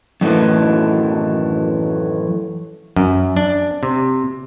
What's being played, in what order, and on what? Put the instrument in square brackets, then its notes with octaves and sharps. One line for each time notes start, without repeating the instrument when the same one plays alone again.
[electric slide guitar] F#2 A2 D#3 E3
[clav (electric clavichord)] F#2
D4
C3